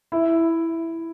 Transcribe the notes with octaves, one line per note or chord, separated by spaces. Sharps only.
E4